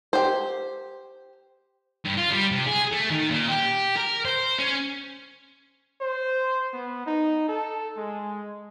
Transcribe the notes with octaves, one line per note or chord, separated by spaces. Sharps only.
G4 C5
G2
F4
G3
C3
G#4
A3
D#3
A#2
G4
A#4
C5
C#4
C5
B3
D#4
A4
G#3